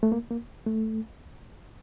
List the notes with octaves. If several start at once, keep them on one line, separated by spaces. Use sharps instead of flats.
A3
A#3
A#3
A3